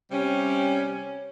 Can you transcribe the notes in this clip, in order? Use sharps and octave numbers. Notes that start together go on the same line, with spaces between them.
C3 G3 C#4